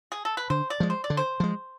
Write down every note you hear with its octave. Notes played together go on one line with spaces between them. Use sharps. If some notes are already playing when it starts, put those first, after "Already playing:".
G#4
A4
B4
D3 C5
D5
F3 G#3
C5
D5
D3
C5
F3 G#3